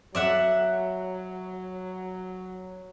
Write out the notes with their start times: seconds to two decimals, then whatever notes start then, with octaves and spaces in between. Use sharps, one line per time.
0.15 F#3 D5 E5 F#5